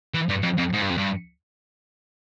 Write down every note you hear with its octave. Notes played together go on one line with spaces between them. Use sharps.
E3
G2
F2
F2
G#2
G2
F2
G2